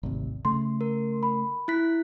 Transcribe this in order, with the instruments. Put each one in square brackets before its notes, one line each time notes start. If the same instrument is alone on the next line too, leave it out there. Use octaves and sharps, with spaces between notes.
[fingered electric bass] G#1 D2 C3
[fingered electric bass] C#3 A3 [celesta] C6
[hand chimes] A#4
[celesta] B5
[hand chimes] E4 F#6 B6